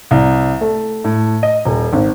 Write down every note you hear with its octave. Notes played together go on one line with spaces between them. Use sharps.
C2
A3
A2
D#5
D#1
G#1